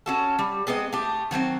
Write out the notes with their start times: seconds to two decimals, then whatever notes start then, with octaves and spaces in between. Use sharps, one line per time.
0.06 C#4 F#4 A4
0.39 G3
0.67 G#3 B3 C4 D#5
0.92 A3 G4
1.31 D#3 F#3 A3 C4